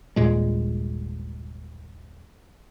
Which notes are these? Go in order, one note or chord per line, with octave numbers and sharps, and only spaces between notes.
G1 D#2 A#2 G#3